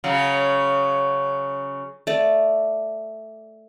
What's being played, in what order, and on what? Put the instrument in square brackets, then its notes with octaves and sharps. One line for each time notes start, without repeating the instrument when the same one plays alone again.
[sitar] C#3 F#3
[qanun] A3 D5